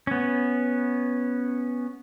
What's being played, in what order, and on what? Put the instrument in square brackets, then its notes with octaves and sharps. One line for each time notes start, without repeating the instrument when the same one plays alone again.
[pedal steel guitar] B3 C#4